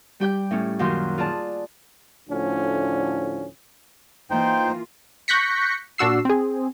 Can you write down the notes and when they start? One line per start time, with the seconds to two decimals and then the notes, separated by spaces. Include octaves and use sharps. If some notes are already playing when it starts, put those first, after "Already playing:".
0.20 G3 G4 G5 G6
0.51 A2 A3 C#4
0.79 F#2 A#2 D#3 F#3 D#4 C6
1.18 F4 G#4 D5 A5
2.28 D2 A2 D3 F3 C#4
4.30 E3 A#3 D#4 F4 C5 G5
5.28 C#6 F#6 G6 A#6 B6 C#7
5.98 A#2 D4 F#4 E6 C7
6.25 C4 G#4